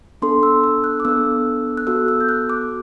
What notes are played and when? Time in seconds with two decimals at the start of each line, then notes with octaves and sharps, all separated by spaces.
0.22 B3 D4 A4 C6
0.43 E6
0.64 E6
0.84 F#6
1.00 D6
1.05 B3 D4 A4 E6
1.77 F#6
1.87 B3 F#4 A4 E6
2.08 E6
2.21 G6
2.29 F#6
2.50 D6